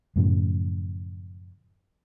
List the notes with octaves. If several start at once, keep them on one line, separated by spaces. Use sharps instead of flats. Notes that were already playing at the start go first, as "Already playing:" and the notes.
F#2 A2 C#3 F3